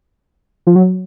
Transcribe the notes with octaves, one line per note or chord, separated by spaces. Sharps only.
F3
F#3